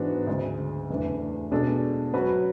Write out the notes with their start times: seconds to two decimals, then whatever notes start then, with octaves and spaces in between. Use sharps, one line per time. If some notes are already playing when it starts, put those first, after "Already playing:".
Already playing: G#2 E3 B3 D4 F#4
0.27 D2 C#3 G#3
0.90 E2 C#3 E3 A3 D4
1.51 B2 G#3 D4 A4
2.14 F#3 C#4 F#4 B4